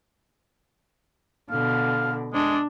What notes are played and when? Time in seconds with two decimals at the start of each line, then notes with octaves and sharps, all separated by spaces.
1.51 B2 D3 F5
2.34 G#3 D4